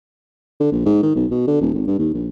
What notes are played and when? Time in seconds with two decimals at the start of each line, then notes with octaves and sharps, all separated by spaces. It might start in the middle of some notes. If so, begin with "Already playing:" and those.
0.60 D3
0.72 A#1
0.85 G#2
1.03 D#3
1.15 B1
1.31 B2
1.47 D3
1.61 D#1
1.74 G#1
1.87 G2
1.99 D#2
2.13 A#1